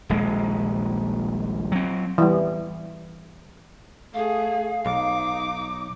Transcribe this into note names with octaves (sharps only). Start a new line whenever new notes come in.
D#1 A#1 G#3
F#3 C4
E3 G3
A3 G#4 F5
B1 D#4 D6